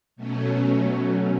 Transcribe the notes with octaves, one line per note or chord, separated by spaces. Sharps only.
B2 F#3 A3 C#4